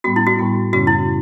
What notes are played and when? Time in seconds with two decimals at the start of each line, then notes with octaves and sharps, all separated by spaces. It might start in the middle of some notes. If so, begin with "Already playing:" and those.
0.04 A2 G3 B3 F#4
0.16 E4
0.27 F#4
0.39 A2 G3 B3
0.73 F#2 C#3 G3 C#4 F#4
0.87 E4